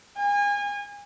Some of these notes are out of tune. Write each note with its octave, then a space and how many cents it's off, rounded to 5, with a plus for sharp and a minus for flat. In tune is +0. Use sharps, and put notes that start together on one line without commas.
G#5 -30